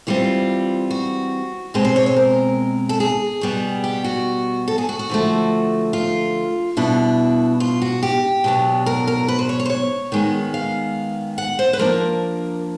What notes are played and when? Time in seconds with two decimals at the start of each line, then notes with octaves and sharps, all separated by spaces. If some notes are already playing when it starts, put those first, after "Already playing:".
0.07 E3 G3 C4 F4
0.90 F#4
1.74 B2 G#3 C4 G4
1.85 C5
1.96 C#5
2.06 C5
2.16 A#4
2.89 A4
3.00 G#4
3.41 B2 G3 B3
3.84 G4
4.04 F#4
4.68 A4
4.78 G#4
4.89 F#4
4.99 F#4
5.09 D3 F3 A3
5.93 F4
6.77 B2 G3 B3 D4 E4
7.60 F4
7.82 F#4
8.03 G4
8.44 B2 F#3 B3 D4
8.86 A#4
9.07 A#4
9.28 B4
9.39 C5
9.49 C#5
9.60 C#5
9.65 C5
9.70 C#5
10.12 D#3 G#3 B3
10.54 F5
11.38 F#5
11.59 C5
11.73 B4
11.79 F3 A#3 D4 A#4